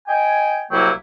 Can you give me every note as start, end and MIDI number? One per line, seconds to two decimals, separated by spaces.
0.08 0.63 75
0.08 0.63 79
0.08 0.63 80
0.71 0.89 36
0.71 0.89 54
0.71 0.89 58
0.71 0.89 64
0.71 0.89 79